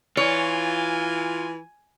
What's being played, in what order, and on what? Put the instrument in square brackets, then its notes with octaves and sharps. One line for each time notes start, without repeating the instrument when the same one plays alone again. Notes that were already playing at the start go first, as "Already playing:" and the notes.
[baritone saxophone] E3 [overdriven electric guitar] F4 [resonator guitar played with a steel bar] C#5 [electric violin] G#5